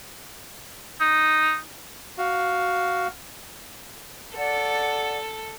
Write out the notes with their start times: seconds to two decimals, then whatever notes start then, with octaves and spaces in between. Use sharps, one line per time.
1.01 D#4
2.18 F#4 F5
4.37 A4 D5 F#5